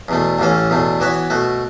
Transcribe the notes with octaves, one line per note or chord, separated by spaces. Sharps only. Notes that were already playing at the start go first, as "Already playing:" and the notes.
E2 B2 A3
A1 A2 E3 C#4 A4
E2 B2 A3
E3 B3 F#4 C#5 E5
B2 A3 F#4